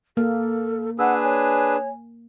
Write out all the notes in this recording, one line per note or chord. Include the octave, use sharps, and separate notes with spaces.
A#3 A4 F6
D4 G#4 B4 F#5 E6
C#5 G#5